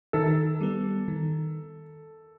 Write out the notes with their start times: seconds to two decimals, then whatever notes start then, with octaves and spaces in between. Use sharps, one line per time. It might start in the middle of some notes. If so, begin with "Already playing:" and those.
0.13 D#3 A4
0.61 G3 B3
1.08 D#3